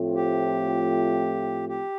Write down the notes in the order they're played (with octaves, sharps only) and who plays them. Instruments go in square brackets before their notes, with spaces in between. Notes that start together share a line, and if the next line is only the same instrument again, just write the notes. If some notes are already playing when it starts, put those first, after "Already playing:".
Already playing: [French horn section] A2 F3 A3 C4 F4
[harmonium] G4
G4